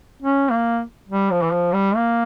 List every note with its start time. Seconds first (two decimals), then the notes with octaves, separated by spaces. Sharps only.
0.22 C#4
0.51 A#3
1.09 G3
1.31 F3
1.42 E3
1.52 F3
1.73 G3
1.96 A#3